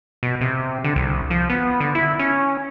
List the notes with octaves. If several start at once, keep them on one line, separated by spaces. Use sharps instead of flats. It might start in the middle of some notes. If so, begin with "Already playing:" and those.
B2
C3
D3
C2
F3
B3
D3
E4
C#4